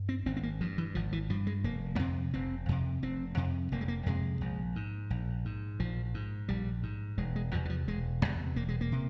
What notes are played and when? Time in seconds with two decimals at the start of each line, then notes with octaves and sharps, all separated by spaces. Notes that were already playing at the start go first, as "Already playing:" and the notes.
Already playing: G2
0.09 C4
0.26 G#1 C4
0.37 C4
0.43 A#3
0.61 G2 F3
0.78 E3
0.95 G#1 F3
1.12 E3
1.30 G2 F3
1.47 G#3
1.64 F1 A#3
1.95 A#3
1.99 F2 C3 C4
2.34 F1 C4
2.69 F2 C3
3.03 F1 C4
3.37 F2 C3
3.72 F1 A#3
3.81 G#3
3.88 A#3
4.06 F2 C3 G#3
4.41 A#1
4.76 G#2
5.10 A#1
5.45 G#2
5.80 A#1 F3
6.14 G#2
6.48 A#1 G3
6.83 G#2
7.18 E1 G#3
7.36 G#3
7.52 E2 C3 F3
7.65 E3
7.70 F3
7.88 E1 G#3
8.22 E2 C3 G#3
8.56 E1 A#3
8.69 G#3
8.81 A#3
8.92 C3